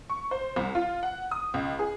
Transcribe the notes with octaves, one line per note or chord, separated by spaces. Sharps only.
C#6
C5
C2
F4
F#5
D#6
C#2
G#4